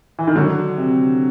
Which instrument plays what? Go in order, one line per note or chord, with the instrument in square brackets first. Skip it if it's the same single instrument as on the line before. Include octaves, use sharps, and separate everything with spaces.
[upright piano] E3
D#3
[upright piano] D3 [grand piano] F#3
[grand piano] C3